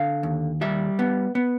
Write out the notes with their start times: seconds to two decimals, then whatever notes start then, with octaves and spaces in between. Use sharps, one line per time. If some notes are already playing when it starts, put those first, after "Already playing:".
Already playing: D3 F5
0.23 D#2
0.61 G3 E5
0.99 B3
1.35 B3